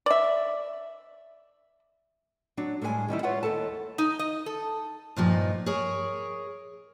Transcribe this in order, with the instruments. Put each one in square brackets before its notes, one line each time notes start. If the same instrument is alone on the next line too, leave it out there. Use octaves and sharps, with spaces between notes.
[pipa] D5 E5
[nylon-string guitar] F#3 D4
A2 G3 G#3 B4 G#5
D#3 G3 D#4 E4
F4 B4 C#5 E5 F#5
D#2 E4 A4 A5
[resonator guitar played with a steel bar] D#4
D#5
A4
[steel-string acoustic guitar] G2 A#2 F3 D#4
G#4 A#4 C#5